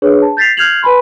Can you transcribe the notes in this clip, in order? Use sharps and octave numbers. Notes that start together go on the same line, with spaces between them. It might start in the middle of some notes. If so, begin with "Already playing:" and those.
D4 G#4 B4 C#5
A5
G6 A6 B6 C7 F7
F6 G6 G#6 C7 F7 F#7
B4 G#5 B5 C6